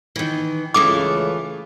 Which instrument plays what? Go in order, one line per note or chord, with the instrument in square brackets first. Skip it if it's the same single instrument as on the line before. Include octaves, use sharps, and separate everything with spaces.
[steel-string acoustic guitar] D#3 E3
[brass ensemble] C#2 A2 C#3 [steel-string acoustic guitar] E3 A3 F4 [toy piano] D6 D#6